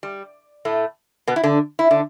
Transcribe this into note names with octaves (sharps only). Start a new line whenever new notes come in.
G3
A2 A3
B2 B3
E4
D3 D4
E4
D3 D4